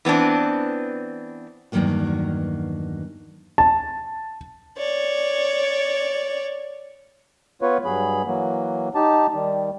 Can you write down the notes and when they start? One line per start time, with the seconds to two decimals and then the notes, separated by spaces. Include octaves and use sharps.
0.05 E3 B3 C4 D4
1.72 E2 G2 D#3 F#3 A#3 F#4
3.58 A5
4.77 C#5 D5
7.62 B3 F4 B4 C#5
7.85 G2 F#3 G#4 B5
8.26 E3 F#3 A#3
8.95 D#4 G4 A5
9.34 D#3 G3